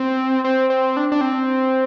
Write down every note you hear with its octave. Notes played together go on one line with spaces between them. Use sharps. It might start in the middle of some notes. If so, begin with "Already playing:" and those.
Already playing: C4
C4
C4
D4
D4
C4